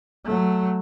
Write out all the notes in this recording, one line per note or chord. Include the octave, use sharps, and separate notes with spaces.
F#3 A3